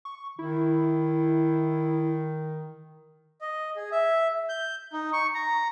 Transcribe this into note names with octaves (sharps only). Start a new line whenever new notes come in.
C#6
D#3 E4
D#5
G#4
E5
G6
D#4
C#6
A#5